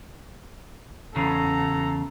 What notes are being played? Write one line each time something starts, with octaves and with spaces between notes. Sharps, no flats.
E2 C#3 A4 A#5